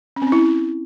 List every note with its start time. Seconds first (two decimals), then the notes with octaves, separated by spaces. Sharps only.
0.16 C#4
0.22 C4
0.27 C#4
0.32 E4